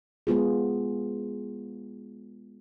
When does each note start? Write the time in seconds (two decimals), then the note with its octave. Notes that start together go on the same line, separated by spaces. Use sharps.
0.27 G#3 B3 F4 G#4